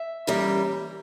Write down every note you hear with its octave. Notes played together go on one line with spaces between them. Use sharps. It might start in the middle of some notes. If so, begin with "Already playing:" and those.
Already playing: E5
C#3 E3 G3 A#3